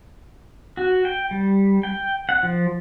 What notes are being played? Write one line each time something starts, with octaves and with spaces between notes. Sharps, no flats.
F#4
G5
G3
G5
F#5
F3